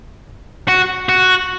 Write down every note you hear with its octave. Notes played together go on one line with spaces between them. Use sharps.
F#4
F#4